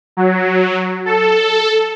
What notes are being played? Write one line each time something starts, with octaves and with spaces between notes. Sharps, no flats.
F#3
A4